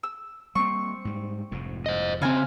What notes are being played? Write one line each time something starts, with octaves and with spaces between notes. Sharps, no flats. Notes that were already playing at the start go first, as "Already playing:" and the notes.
E6
G3 A#3 C4 C#6
G#2 G3
F1 F2 G#2
C5 D#5
C#3 C4 F5 G#5